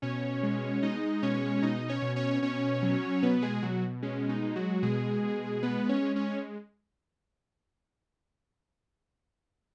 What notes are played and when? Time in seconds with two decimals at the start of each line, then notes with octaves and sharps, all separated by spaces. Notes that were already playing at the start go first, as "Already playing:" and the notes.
0.02 B2 C#4 C#5
0.43 G#3
0.82 G#3 D#4 D#5
1.22 B2 C#4 C#5
1.62 B2 D#4 D#5
1.89 C#4 C#5
2.02 B2
2.16 C#4 C#5
2.42 B2 C#4 C#5
2.82 F#3
3.23 B2 B3 B4
3.42 G#3 G#4
3.62 B2 F#3 F#4
4.02 G#3 C#4
4.29 D#4
4.42 G#3
4.56 F#3 F#4
4.83 B2 G#3 G#4
5.22 B2
5.62 G#3 B3 B4
5.89 C#4 C#5
6.02 G#3
6.16 C#4 C#5